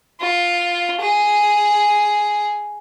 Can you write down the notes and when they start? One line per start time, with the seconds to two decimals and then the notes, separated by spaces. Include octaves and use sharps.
0.21 F4
1.02 G#4